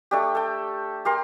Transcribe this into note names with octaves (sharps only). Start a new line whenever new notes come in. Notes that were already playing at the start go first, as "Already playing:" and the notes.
A3 D4 G4
A4 G5
G4 A#4 C6